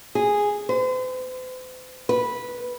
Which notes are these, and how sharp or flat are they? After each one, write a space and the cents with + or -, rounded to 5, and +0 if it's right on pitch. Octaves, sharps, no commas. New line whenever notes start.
G#4 -5
C5 -45
B4 -10